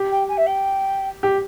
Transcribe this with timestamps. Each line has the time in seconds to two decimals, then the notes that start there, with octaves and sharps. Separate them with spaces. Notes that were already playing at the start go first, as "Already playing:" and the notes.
Already playing: G4
0.11 G5
0.28 G#5
0.37 E5
0.46 G5
1.23 G4